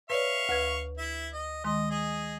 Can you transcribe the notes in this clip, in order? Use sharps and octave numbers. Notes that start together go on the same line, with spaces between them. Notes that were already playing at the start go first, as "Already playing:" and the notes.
B4 C#5 D5 E5 F5 C#6
D2 B4 G#6
E4 E5
D#5
D#3 G#3 D#5 C6
G#4 D#5